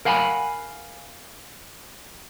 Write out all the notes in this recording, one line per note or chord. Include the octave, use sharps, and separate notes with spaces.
A#4 F5 F#5 G#5 A#5 B5